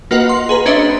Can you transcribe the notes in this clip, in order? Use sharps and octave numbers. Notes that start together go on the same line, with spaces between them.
A#3 F4 F#4 B4 D#5 F#5
C6
G#4 B4 A#5
C#4 D4 B4 C5 D#5 E5